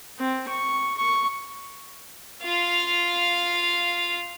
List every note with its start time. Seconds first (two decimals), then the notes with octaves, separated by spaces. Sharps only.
0.19 C4
0.48 C#6
0.97 C#6
2.43 F4 F5